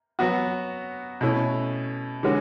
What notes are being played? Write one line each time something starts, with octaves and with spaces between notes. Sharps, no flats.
F#3 B3 F#4
B2 A3 C#4 E4
D3 G#3 C#4 F#4